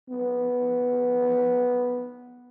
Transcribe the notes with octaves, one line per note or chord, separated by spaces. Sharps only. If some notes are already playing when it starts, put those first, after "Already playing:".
B3